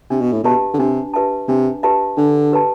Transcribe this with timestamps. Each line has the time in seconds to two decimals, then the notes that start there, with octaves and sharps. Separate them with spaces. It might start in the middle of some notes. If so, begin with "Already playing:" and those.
0.10 C3 D4
0.21 B2
0.32 A2
0.43 B2 G4 B4 E5 A5
0.74 D3
0.79 C3 D4
1.14 G4 B4 E5 A5
1.48 C3 D4
1.83 G4 B4 E5 A5
2.17 D3 D4
2.52 G4 B4 E5 A5